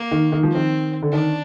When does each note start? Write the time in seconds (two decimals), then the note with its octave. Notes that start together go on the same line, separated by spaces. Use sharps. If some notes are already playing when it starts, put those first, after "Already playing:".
Already playing: A#3
0.11 D#3
0.32 D#3
0.43 F3
0.52 D#3 C4
1.02 D3
1.12 D#3 D4